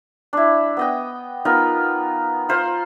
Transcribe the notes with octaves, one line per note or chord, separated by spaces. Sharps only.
D4 E4
B3 D#5 G5
B3 D#4 F4 A#4
F4 C5 F5 B5